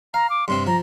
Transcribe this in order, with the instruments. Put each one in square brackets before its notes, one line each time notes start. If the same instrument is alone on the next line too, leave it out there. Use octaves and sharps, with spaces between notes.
[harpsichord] F5 [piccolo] A#5
[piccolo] D6
[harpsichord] G2 C3 C4 [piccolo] C6
[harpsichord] F3 [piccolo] A#5